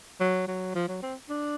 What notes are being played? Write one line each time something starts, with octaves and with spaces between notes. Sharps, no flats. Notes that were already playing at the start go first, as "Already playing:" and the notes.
F#3
F#3
F3
F#3
C4
D4